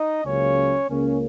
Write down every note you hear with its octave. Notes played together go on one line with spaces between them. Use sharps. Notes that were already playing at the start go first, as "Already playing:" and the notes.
Already playing: D#4 D#5
C#2 C#3 F#3 A#3 C#4 C#5
C#2 C#3 A#3 C#4